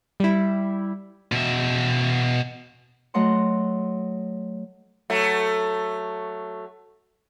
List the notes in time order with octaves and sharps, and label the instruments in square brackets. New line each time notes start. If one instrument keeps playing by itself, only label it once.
[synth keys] G3 E4
[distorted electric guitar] B2 E5
[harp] F#3 A3 D#5 F#5 C6
[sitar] F#3 A3